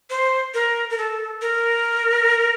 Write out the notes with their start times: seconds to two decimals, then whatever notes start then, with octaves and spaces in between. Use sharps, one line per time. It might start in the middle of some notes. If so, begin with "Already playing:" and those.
0.10 C5
0.54 A#4
0.90 A#4
0.98 A4
1.41 A#4